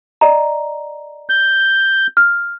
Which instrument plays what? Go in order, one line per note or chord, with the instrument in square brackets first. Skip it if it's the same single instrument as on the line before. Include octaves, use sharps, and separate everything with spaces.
[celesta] D5 D#5 A#5
[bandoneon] G6
[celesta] F6